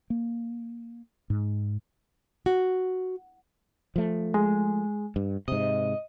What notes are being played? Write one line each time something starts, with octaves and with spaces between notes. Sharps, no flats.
A#3
G#2
F#4
F3 A3
G#3
G2
G#2 C3 D#5